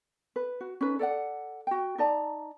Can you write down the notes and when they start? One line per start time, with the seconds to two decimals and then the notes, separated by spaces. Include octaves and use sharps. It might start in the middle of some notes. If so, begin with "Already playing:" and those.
0.36 B4
0.61 F#4
0.81 C#4 D#4 B4
0.99 A4 D5 D#5 F#5
1.67 F#4 G5
1.98 D#4 D5 A5 A#5